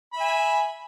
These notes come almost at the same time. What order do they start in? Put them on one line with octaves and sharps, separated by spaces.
B5 E5 G#5